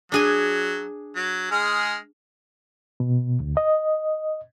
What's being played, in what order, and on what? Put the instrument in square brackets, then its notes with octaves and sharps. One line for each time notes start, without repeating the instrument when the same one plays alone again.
[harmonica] F#3 [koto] D4 G#4 G#5
[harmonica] F#3
G#3 G#4 F6
[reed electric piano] B2
D2
D#5